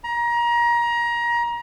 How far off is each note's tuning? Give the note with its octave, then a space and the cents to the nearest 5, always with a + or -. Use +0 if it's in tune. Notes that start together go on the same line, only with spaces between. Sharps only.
A#5 +25